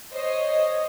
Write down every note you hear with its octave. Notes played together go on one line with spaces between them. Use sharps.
C5 C#5 D#5